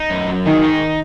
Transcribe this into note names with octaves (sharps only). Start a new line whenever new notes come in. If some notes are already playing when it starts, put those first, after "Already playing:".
Already playing: D#4
F#2
F#3
D#3 G#4
D#4